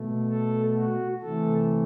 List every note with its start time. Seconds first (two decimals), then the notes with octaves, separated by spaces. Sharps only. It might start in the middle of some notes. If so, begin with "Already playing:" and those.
Already playing: B2 A3
0.29 A4
0.76 F#4
1.21 C3 E3 A3 A4